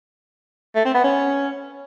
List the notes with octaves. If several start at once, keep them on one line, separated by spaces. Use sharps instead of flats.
A3
C4
B3
C#4